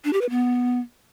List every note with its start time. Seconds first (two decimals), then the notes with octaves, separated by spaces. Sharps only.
0.05 D4
0.13 G4
0.21 B4
0.30 B3